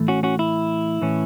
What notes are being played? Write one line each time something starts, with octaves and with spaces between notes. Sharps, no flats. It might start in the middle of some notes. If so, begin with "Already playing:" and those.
Already playing: A2 E3 A3
C#4 F#4
C#4 F#4
E4
A2 E3 C#4